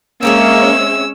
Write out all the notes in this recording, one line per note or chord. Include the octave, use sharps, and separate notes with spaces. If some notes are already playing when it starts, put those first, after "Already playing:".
G#3 A#3 C4 C#4 G#4 C#5 E5 E6